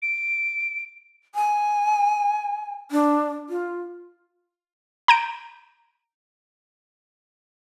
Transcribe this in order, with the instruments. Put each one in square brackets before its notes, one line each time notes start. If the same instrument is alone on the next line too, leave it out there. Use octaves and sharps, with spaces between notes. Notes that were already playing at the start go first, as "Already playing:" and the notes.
[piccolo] D7
[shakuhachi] G#5
D4
F4
[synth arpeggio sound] A#5 G6 D7